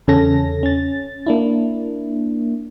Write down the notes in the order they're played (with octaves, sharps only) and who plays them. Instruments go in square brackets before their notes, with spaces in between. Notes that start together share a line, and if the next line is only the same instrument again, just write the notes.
[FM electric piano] E2 C#3 C#4 A4 A#6
C#4 A6
A#3 D4 E4